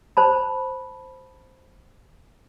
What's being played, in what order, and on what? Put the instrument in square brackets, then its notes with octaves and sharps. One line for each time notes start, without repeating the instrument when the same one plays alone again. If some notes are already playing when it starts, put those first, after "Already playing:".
[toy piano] C5 A5 B5